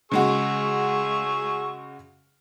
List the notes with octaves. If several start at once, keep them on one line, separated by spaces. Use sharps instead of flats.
C#3 G#3 F#4 G#4 C#6 E6